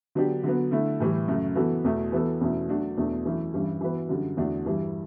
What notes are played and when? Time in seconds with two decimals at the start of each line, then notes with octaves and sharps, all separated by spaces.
0.15 D3 F#3 B3 D4 G4
0.43 D3 F#3 B3
0.71 D3 A3 E4
1.00 A2 E3 G3
1.28 F#2 C#3 F#3 A3
1.56 E3 B3 F#4 A4
1.84 E2 B2 A3
2.12 E3 B3 F#4 A4
2.41 E2 B2 A3 C#4 E4
2.68 F#3 A3 D4 F#4
2.97 E2 B2 A3 D4
3.25 F#2 E3 A3 C#4 E4
3.54 G2 E3 G3 C#4
3.81 E3 B3 F#4 B4
4.09 F#2 D3 G3
4.37 E2 D3 A3 D4 F#4
4.65 G2 E3 G3